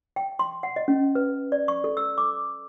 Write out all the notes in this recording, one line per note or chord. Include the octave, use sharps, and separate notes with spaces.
G5
C6
F#5
D#5
C#4
B4
D5
C#6
A4
E6
D6